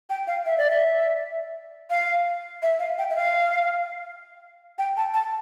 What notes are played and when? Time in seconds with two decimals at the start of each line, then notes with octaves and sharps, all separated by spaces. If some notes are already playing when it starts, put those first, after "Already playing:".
0.10 G5
0.27 F5
0.46 E5
0.58 D5
0.71 E5
1.90 F5
2.62 E5
2.79 F5
2.98 G5
3.10 E5
3.16 F5
4.78 G5
4.97 A5
5.14 A5